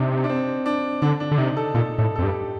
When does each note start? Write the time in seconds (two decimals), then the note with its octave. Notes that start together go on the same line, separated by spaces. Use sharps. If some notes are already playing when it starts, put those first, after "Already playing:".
Already playing: C3 D4 D#4
0.24 D4
0.30 C4
0.66 D4
1.02 D3 D4
1.20 D4
1.31 D3
1.38 C3 D#4
1.57 A4
1.74 A#2 A4
1.98 A2 A4
2.16 A4
2.19 F2
2.22 G2 G4